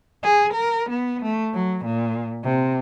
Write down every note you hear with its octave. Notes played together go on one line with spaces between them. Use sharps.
G#4
A#4
B3
A3
F#3
A#2
C3